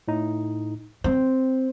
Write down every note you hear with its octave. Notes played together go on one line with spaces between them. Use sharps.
A2 D#4
C4 C5